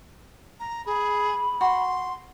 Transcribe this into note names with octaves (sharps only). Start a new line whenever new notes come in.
A#5
G#4 B5
F#4 C6